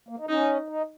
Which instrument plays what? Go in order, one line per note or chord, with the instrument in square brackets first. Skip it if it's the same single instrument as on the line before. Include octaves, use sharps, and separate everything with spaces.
[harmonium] A#3
D#4
[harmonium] C#4 [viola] D#4
[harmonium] D#4